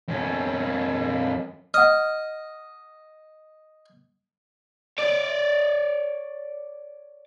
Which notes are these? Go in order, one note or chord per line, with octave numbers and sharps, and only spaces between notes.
F2 C#4
D#5 F#5 F6
C#5 D5